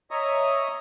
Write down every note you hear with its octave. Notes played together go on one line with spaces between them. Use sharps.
C#5 D#5 E5 A#5 C#6 D#6